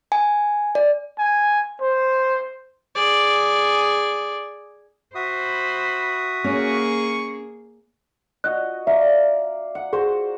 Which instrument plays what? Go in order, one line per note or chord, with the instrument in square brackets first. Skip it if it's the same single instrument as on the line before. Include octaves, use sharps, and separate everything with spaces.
[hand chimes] G#5
D5
[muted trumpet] G#5
C5
[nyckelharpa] G#4 D5
[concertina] F#4 E5 D#6 [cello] C5 [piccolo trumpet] B5
[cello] A#3 G#4 [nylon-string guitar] C#4 [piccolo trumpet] C#6
[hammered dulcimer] F#4 D#5 [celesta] F#6
[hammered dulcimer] D5 F5 A#5 [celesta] E5
[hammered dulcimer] F#5
[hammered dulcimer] F#4 C5 [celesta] G#4